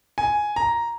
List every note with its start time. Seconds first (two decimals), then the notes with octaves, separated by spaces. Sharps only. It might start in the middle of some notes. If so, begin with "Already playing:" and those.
0.18 G#5
0.56 A#5